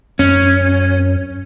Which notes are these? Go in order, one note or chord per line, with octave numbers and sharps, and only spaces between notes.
F#2 C#4